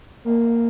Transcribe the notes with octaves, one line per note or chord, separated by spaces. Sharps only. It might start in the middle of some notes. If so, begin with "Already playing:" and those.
A#3